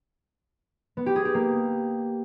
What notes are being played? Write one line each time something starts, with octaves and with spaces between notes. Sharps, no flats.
B3
G4
G#4
G4
A#3